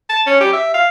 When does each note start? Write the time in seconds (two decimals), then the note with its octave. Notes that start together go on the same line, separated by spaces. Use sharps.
0.09 A5
0.27 C#4
0.40 G4
0.53 E5
0.74 F5